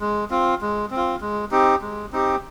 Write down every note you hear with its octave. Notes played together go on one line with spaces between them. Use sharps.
G#3
C4 F4
G#3
C4
F4
G#3
C4 D#4 G4
G#3
C4 D#4 G4